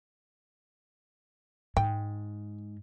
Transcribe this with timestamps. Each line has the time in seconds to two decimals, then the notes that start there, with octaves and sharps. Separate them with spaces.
1.77 G#2 G5